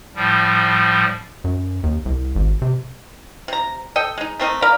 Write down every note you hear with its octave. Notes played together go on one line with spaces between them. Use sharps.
A2 F3 G3
F#2
D#2
C2
G#1
C3
C3 A#5
A4 D#5 G5
G#3 D#4
A3 C4 A#4 D#5
A#4 D5 F5 B5